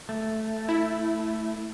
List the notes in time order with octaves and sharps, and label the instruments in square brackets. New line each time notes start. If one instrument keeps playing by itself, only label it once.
[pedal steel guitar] A3
[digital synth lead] E4